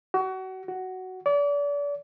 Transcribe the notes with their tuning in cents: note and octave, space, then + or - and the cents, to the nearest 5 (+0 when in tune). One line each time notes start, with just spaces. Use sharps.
F#4 +30
F#4 +10
D5 -35